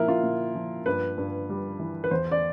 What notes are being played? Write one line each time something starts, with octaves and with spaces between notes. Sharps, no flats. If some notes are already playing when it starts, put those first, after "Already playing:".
Already playing: A#2 F3 E4 A#4
F4
A#2
F3
G2 B4
G2
G3
E3
B4
E2 C5
D5